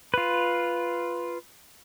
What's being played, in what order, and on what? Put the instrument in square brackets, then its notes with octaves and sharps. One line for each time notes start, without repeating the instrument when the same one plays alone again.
[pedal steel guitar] F4 B4